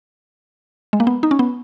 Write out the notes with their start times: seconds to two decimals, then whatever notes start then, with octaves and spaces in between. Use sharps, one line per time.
0.93 G#3
1.00 A#3
1.07 B3
1.23 D#4
1.31 C#4
1.39 B3